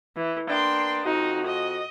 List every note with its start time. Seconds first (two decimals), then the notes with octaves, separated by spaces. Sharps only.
0.16 E3
0.49 A#3 B3 D4 G5 C6
1.05 F2 D#4 F#4
1.47 D#5